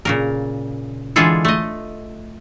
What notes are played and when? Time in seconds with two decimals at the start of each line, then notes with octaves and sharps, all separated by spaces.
0.05 A#2 C#3 A#4
1.16 D3 E3 G#3 F4 G#4 A4
1.45 A3 D#5